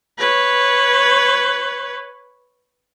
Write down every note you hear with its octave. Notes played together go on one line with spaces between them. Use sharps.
B4 C#5